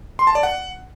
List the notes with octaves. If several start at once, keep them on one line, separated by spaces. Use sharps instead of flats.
C6
A5
D5
F#5